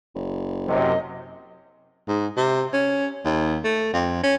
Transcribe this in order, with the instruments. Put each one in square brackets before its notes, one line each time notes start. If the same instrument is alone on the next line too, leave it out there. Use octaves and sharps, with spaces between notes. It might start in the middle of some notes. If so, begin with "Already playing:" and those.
[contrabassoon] F#1
[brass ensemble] F#2 C3 [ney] D#5
[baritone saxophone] G#2
C3
C#4
D#2
A3
F2
C#4